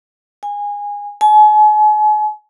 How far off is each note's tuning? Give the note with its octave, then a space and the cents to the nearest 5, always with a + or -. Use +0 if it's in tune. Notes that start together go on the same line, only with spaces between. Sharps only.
G#5 -20
G#5 +40